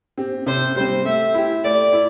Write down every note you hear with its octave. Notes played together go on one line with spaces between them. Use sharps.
C4 G4
C3 C5
G3 C4 C5
A3 E5
E4 G4
A3 D5
E4